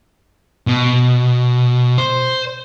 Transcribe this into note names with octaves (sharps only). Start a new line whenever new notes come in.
B2
C5